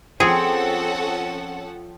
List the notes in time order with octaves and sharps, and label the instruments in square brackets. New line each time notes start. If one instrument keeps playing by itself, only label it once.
[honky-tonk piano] F3 G5 C#7 [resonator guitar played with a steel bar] C4 [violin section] C#4 A4 F#5 [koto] G#4